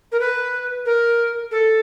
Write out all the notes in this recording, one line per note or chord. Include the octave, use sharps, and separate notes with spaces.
A#4
B4
A#4
A4